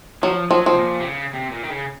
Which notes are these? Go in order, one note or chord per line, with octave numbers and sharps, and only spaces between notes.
F3 F#3
F3 F#3
F3
C3
A#2
C3
C#3
C3
A#2
D#3
C#3